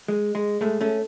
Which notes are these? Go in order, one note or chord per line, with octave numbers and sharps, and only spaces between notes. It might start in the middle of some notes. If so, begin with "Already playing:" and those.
G#3
G#3
A2 G#3 A3
A3 C#4